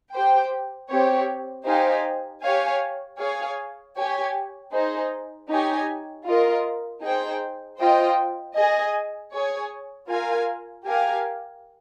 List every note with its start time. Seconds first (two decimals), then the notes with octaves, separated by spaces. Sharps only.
0.12 G4 C5 G5
0.89 C4 G4 C#5
1.65 D#4 G4 C5 F5 G#5
2.42 G4 C#5 F5 G#5
3.19 G#4 C#5 F5 G#5
3.96 G4 C#5 G#5
4.72 D#4 G#4 C5
5.49 D#4 G4 C#5 G#5
6.25 F4 A#4 D#5
7.03 D#4 G#4 C5 G5
7.79 F4 C5 D#5 G5
8.55 G#4 D#5 G#5
9.32 G#4 C#5 G#5
10.08 F4 A#4 F5 G#5
10.85 G4 A#4 F5 G#5